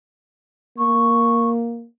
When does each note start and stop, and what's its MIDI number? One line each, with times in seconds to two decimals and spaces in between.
0.78 1.86 58
0.78 1.49 85